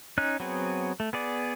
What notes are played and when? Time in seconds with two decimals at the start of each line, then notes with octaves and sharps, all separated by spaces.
0.18 C#4 D#4 F#6
0.40 F#3 B3 C4 G#4
1.00 A3
1.13 B3 G#4 D5